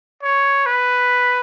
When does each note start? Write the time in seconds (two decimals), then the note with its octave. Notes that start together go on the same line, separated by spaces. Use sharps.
0.23 C#5
0.66 B4